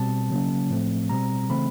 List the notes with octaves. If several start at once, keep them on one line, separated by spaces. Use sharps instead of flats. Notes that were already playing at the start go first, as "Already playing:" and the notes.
Already playing: B2 G3 C4 A5
C#3 F#3 A#3 C#4
A2 F3 A3 C4
B2 G3 C4 A#5
C#3 E3 A3 C4 B5